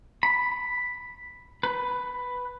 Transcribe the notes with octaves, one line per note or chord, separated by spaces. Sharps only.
B5
B4